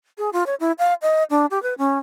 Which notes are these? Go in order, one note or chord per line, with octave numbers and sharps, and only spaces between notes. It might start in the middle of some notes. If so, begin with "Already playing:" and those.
G#4
F4
C#5
E4
F5
D#5
D4
G4
B4
C#4